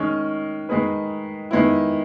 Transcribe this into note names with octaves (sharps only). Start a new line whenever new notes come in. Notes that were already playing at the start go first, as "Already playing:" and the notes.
Already playing: D#3 G#3 C#4
D#3 G#3 D#4 G#4 B4
D#3 G#3 B3 E4